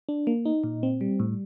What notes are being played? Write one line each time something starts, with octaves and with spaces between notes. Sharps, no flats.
D4
A#3
D#4
A#2
C4
G3
A2